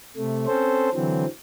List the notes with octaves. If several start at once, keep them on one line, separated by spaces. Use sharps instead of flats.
C3 A3
C4 C#4 A4 C5
D3 E3 F#3 C4